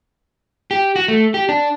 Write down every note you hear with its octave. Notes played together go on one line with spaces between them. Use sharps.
G4
F#4
A3
G4
D4